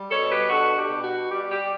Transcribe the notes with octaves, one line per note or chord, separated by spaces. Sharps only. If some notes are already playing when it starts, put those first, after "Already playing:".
Already playing: G3
B2 A4 C#5
G4 B4
D4 F#4 A4
G4
B2
F#4
G3 G4
G4